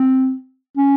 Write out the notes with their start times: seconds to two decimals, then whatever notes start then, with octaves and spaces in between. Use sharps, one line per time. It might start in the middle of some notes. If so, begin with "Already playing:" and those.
Already playing: C4
0.77 C#4